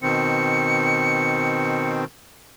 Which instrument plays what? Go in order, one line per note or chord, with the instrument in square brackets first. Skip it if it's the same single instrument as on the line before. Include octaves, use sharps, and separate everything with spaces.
[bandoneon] B2 D#3 C4 [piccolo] C#7